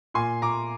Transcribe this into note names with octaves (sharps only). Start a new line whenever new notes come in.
A#2 G#5 C6
A#2 A#5 D6